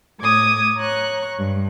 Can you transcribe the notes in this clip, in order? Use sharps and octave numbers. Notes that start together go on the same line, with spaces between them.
A2 D6 D#6 G#6
C#5 A#5 C#6 F#6
G2